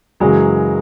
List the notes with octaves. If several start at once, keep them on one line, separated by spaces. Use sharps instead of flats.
F#2 C#3 E3 F#3 G#3